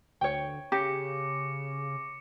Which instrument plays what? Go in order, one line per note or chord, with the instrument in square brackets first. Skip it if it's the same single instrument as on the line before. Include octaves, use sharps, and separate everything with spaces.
[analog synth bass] D2 [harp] C#5 G5 [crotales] C#6
[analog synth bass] C#3 [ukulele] G4 [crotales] D6 A#6 C#7